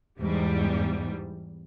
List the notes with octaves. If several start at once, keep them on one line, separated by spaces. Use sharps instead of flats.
E2 G#2 G3